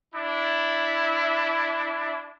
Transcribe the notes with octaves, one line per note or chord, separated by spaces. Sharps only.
D4 E4